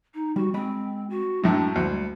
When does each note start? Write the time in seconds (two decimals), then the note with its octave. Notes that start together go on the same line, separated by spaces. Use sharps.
0.14 D#4
0.36 G3 F#4
0.54 G#3 C4 D#5 B5
1.10 F#4
1.44 F#2 A2 F#3 G#3 A3 D4
1.76 D2 G3